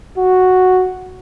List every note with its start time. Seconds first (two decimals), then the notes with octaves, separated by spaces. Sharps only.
0.18 F#4